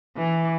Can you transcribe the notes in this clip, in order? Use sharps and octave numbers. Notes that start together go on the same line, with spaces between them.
E3